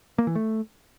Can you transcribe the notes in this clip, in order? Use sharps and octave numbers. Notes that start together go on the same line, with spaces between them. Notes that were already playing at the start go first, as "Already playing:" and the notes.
A#3
E3
A3